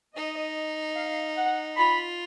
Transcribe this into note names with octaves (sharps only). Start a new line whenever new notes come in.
D#4 D#5
F5
F#5
F4 B5